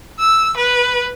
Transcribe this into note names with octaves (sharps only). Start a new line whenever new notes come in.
E6
B4